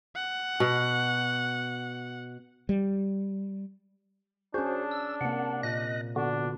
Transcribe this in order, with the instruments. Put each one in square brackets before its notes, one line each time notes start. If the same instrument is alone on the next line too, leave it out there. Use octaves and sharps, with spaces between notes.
[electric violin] F#5
[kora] B2
[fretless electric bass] G3
[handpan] C#4 G#4 [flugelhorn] D4 [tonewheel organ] F#4 C5 [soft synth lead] A5
[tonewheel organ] E6
[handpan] C3 A#3 [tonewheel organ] F#5
[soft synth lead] A#2 [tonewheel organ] D#5 F#6 A#6
[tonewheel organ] D3 B3 F#4 [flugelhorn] D4